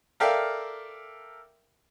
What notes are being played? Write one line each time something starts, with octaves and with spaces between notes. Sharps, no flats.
A4 A#4 D5 E5 F5 G5